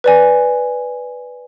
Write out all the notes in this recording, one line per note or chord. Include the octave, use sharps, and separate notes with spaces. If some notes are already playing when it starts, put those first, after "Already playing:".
B4 D5 G#5